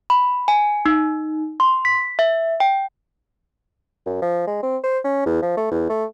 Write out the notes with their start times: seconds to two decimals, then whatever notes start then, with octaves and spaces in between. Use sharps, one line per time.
0.10 B5
0.48 G#5
0.85 D#4
1.60 C6
1.85 B6
2.19 E5
2.60 G5
4.06 F#2
4.22 F3
4.47 G#3
4.62 C4
4.83 C5
5.04 C#4
5.26 E2
5.42 F3
5.57 A3
5.71 E2
5.90 A3